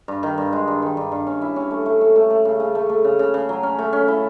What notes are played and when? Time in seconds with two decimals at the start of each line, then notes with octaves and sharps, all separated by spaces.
0.08 G2
0.23 D#3
0.38 G2
0.53 G#3
0.68 G2
0.82 D#3
0.97 G2
1.12 G2
1.27 C#4
1.42 E4
1.56 C#4
1.71 A3
1.86 A3
2.01 A3
2.16 A3
2.30 A3
2.45 C#3
2.60 C#3
2.75 A3
2.89 A3
3.04 C#3
3.19 C#3
3.34 C#3
3.49 F#3
3.63 C#4
3.79 A3
3.93 C#4
4.08 E4